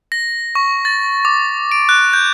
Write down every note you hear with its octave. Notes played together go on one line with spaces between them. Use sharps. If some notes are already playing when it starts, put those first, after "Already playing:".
A#6
C#6
A6
D6
D7
F#6
G6